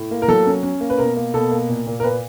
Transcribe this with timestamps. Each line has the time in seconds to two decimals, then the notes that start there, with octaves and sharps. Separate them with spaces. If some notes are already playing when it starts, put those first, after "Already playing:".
Already playing: A2
0.11 A#3
0.22 A#4
0.28 F#3 A4
0.46 C#4
0.63 C#4
0.80 A#3
0.90 B4
0.98 B2 A#4
1.16 A#3
1.34 B2 A4
1.51 A#3
1.69 A#2
1.87 A#2
2.00 A#4
2.03 A#2 B4